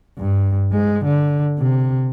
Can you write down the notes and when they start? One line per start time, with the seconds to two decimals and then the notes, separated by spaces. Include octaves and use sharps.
0.18 G2
0.72 G#3
1.05 D3
1.59 C3